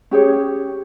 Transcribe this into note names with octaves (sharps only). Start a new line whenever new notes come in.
C#4 G4 G#4 C#5